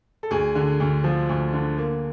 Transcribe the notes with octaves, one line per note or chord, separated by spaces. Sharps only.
A4
D2 G#4
D3
D2
F3
D2
D3
A#3